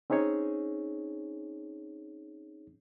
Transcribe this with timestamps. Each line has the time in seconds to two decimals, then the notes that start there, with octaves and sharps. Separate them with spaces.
0.10 C4 C#4 D#4 G#4 C#5